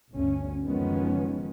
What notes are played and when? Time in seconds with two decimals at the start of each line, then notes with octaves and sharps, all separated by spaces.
0.11 G1 D2 C#4
0.64 F#1 D#3 F3 G#3 B3 C#4